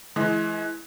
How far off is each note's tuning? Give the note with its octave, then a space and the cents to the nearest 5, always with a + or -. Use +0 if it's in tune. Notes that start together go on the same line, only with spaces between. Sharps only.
E3 +0 G#3 +30